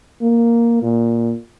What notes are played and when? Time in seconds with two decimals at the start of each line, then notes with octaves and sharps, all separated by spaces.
0.22 A#3
0.82 A#2